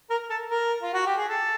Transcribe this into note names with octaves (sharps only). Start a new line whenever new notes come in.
A#4
A4
A#4
F4
F#4
G4
G#4
A4